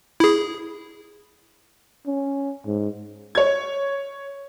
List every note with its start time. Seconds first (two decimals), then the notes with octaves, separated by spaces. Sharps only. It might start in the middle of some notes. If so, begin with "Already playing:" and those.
0.20 E4 G#4
2.07 C#4
2.66 G#2
3.35 C#5 G#6